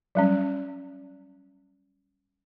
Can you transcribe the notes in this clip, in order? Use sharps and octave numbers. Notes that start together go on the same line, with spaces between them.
F#3 G3 C#4